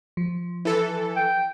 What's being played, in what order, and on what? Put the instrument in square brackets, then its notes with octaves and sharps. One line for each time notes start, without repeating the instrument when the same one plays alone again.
[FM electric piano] F3
[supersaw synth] E3 A4
[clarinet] G5